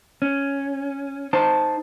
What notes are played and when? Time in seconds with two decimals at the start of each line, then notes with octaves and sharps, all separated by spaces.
0.22 C#4
1.33 D#4 C5 A5